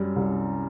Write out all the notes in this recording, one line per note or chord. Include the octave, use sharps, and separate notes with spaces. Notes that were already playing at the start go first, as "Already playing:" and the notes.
Already playing: F#2 G3
C2